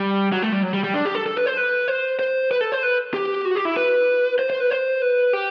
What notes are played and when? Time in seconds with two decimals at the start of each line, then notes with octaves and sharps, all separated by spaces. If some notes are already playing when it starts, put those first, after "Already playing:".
Already playing: G3
0.32 F#3
0.42 A3
0.52 G3
0.63 F#3
0.74 G3
0.84 G3
0.94 D4
1.05 G4
1.15 A4
1.26 A4
1.37 B4
1.46 C5
1.57 B4
1.88 C5
2.19 C5
2.51 B4
2.61 A4
2.72 C5
2.83 B4
3.14 G4
3.45 F#4
3.55 G4
3.65 E4
3.77 B4
4.39 C5
4.50 C5
4.60 B4
4.70 C5
5.02 B4
5.33 G4